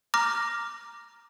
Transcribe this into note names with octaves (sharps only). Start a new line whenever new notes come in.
A#5 D6 F6 A#6